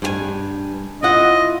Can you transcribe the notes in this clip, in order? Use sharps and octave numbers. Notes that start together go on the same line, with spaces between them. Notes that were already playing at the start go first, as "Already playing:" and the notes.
G2 G4 G#5
E4 F4 D#5 F#5